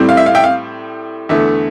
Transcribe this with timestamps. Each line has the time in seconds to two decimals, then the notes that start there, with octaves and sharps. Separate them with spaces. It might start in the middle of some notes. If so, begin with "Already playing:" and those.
Already playing: A2 G3 C4
0.09 F5
0.17 E5
0.26 F5
0.35 E5 G5
0.44 F5
1.29 E2 D3 A3 E5